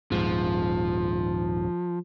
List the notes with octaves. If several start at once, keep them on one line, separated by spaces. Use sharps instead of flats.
D#1 G#2 F3